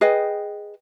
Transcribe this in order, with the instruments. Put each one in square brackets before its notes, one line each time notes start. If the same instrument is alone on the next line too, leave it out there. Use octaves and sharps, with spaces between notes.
[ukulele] G#4 B4 D#5 G5